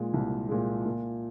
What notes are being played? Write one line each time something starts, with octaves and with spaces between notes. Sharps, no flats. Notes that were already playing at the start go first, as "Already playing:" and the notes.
Already playing: A#2 G#3
C2
A#2 G#3
A#2